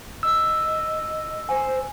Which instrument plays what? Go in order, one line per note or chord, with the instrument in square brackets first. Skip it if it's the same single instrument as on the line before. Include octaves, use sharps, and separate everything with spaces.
[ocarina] D#5 [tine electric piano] E6
[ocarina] C5 [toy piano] G#5